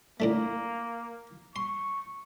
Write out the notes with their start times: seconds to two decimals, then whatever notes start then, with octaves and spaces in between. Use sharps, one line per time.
0.20 A2 D3 A3 A#3
1.56 C6 C#6